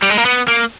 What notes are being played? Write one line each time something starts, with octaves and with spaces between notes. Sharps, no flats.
G3
G#3
A#3
B3
A#3